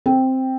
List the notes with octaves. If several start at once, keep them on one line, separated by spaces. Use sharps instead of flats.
C4